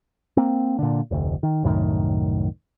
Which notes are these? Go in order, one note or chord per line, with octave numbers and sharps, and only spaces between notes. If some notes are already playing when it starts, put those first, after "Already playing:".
A#3 C4
A#2 D3
F1 D2
D#3
C2 F#2 A2 D#3